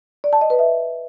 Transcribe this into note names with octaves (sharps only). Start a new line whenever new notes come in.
D5
A5
D#5
B4
E5